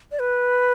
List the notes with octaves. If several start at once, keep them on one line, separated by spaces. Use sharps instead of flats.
D5
B4